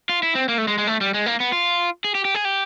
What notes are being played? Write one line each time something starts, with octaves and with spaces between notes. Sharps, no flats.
F4
E4
C4
A#3
A3
G#3
G#3
A3
G3
G#3
A#3
B3
F4
G#4
G4
G4
G#4
G4